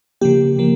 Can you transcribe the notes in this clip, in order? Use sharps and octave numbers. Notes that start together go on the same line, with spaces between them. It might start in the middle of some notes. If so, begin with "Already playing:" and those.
C#3 F3 A#3 G4
C#3 F3 A#3